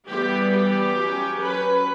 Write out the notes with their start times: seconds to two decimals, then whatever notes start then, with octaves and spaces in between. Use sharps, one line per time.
0.08 E3 G3 B3 G4
0.52 G4
0.97 F#3 C#4
1.41 B4